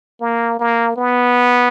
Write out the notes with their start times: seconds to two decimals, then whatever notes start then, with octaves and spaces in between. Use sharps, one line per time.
0.21 A#3
0.59 A#3
0.96 B3